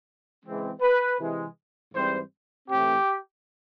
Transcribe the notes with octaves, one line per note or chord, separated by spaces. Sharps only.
C#3 E3 G#3 C4
B4
C3 E3 G#3
G#2 E3 G3 C4 C5
A2 E3 A3 C4 G4